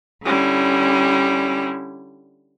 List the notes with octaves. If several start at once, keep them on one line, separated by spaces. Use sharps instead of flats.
D3 G3 C#4 E4